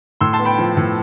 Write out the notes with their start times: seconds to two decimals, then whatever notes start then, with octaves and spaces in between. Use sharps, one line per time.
0.21 A2 C6 E6
0.33 A5 C6
0.39 B3
0.45 G5 B5
0.58 F3
0.77 A2